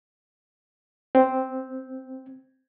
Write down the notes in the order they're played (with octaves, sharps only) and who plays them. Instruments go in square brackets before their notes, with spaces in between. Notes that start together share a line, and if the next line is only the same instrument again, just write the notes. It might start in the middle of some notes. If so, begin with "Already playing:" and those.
[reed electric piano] C4